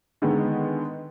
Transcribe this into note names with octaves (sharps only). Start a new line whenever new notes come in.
D3 D#3 G#3 B3